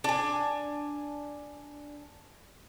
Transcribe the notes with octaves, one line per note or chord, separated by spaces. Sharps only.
D4 G#5